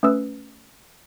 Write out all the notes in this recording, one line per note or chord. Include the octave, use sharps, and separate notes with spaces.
A3 C#4 B4 D#6 E6